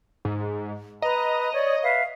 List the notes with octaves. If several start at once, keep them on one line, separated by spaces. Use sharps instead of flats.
G#2
B4 D#5 A#5
C#5 D5
B4 E5 F5